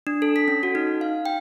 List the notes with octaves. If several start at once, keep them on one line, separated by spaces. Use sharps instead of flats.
D4
A4
B6
C#4
F#4
D#4
F5
G5